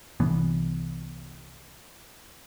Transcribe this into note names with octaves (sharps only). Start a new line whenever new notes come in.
C2 E3 B3